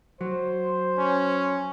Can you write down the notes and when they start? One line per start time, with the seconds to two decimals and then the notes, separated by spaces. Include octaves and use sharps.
0.21 F#3 C5
0.98 C#4